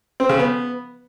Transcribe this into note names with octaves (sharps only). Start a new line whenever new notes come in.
C4
C#3
B3